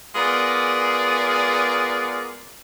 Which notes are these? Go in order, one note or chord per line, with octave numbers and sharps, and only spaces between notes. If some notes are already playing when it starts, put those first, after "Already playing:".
G#3 B3 F4 G#4 A#4 D5